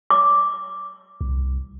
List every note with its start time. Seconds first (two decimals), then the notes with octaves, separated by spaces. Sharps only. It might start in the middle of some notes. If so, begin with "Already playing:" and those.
0.10 D6
1.21 C2